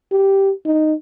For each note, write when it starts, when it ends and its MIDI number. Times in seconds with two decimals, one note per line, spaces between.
0.12 0.52 67
0.66 0.94 63